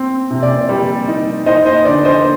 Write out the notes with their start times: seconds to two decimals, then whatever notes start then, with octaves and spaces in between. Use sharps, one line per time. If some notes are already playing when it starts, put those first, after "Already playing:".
Already playing: C4
0.30 C3
0.43 D5
0.69 G3
1.08 D#4
1.46 D#4 C5 D#5
1.66 C5 D#5
1.85 D3 D5
2.05 C5 D#5